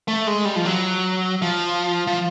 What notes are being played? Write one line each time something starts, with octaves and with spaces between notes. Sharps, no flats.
A3
G#3
G3
F3
F#3
F3
F3